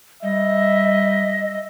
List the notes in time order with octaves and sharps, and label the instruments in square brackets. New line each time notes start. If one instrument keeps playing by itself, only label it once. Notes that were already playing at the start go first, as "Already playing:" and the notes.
[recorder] G3 [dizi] D#5 [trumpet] E5